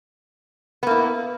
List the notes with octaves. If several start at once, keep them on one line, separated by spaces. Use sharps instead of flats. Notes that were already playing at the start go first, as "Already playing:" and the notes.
A#3 B3 E4